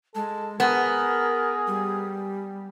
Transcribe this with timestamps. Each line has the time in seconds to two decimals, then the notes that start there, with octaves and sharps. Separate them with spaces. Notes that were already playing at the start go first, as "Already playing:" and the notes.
0.15 G#3 A4
0.60 B3 G#4 A#4
1.67 G3